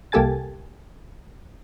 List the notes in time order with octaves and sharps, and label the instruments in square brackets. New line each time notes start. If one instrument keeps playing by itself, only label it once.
[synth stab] C2 A#3 G4 A4 G#5 A6